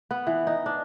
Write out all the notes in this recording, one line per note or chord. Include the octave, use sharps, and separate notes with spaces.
B3
E3
D#4
D4